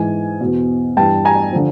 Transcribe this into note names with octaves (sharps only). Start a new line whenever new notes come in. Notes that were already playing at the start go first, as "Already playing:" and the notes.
Already playing: G#2 E3 G#5
E2 B2
G2 E3 G5 A5
G#5 A#5
D3 F3